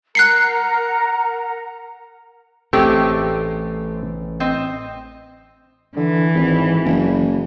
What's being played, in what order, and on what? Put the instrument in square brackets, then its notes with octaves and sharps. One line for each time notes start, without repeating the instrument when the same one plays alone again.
[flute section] A#4 F#5 A#5 [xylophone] F#6 C7 C#7
[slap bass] A1 A2 [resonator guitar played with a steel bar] G#3 C4 G4 [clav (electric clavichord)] A3
[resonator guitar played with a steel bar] C4 D#5
[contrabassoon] D3 [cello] E3
[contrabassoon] G#1
F#1